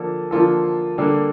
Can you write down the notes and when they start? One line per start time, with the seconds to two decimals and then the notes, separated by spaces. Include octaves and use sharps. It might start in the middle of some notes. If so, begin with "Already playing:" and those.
Already playing: D3 F3 A#3 A4
0.31 D3 F3 A#3 F4 A4
0.98 D3 G3 A#3 D4 A4